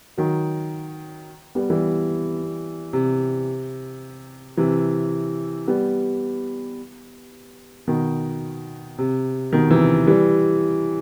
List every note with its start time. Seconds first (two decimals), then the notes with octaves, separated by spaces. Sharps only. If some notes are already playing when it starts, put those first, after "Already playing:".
0.17 D#3 F#3
1.55 G3 B3
1.70 E3 G3
2.93 C3
4.57 C3 E3
5.68 G3 B3
7.87 B2 D#3
8.98 C3
9.52 B2 D#3
9.71 C3 E3
10.07 E3 G3